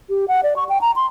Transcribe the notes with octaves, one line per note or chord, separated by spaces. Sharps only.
G4
F#5
D5
C#6
G5
A#5
C6